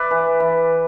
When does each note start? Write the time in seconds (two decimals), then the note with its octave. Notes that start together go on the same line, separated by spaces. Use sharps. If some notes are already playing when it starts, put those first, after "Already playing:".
Already playing: B4 D5 E5
0.11 E3
0.40 E3